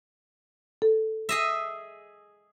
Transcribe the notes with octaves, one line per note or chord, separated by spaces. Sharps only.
A4
G#4 D#5 E5